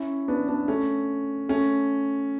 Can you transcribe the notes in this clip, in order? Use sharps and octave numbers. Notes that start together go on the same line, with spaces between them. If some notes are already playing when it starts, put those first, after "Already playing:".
Already playing: C#4 E4
B3 D4
B3 D4
A3 C#4
A3 C#4